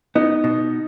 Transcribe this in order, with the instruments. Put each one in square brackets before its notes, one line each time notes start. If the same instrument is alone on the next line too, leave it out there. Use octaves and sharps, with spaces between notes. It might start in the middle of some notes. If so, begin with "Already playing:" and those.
[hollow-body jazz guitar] B3 [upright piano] D#4
[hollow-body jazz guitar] B2